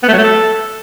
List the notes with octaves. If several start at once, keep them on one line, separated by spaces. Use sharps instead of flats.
B3
A3
F#3
A3
A4